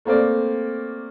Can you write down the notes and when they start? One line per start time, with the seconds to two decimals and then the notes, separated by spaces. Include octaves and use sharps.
0.05 A3 A#3 C4 D5